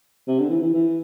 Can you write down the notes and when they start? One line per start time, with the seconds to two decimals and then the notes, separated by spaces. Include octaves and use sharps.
0.28 C3
0.40 D3
0.50 E3
0.62 E3
0.74 E3